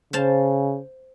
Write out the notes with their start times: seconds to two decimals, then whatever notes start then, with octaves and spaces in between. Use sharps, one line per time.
0.13 C#3 C5 F5 A5